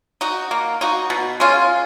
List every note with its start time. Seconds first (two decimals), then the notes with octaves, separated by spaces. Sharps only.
0.21 D#4 F#4
0.51 A#3
0.81 D#4 F#4
1.10 B2
1.40 G#3 C#4 F4